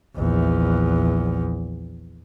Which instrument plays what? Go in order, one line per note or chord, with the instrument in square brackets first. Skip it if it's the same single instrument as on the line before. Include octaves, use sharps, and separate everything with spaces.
[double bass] A#1 E2